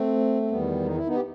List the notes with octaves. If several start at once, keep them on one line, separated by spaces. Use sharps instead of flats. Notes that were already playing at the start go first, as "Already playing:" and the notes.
Already playing: A3 C4
C4
E2 D#3 G3 B3
D#4
E4
B3 D#4
G4